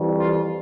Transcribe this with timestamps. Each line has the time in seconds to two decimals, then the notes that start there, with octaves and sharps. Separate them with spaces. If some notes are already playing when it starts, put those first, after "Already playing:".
Already playing: F2 E3 G3
0.18 F4